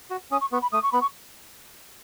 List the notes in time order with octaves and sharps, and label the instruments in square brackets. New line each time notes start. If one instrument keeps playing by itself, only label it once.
[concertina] F#4
[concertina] C#4 [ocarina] D#6
[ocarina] C#6
[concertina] B3 [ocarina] C#6
[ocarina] B5
[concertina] A3 [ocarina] D#6
[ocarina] C#6
[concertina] B3 [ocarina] B5
[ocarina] C#6